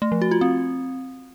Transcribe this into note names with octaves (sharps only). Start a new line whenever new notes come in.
A3
F3
F#4
F4
C4